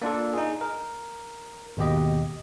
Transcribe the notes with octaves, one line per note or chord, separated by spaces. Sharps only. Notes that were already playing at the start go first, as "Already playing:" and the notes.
A#3 D4 F4 A4
D#4 G#4
A#4
G#1 D#2 B2 G4 D#5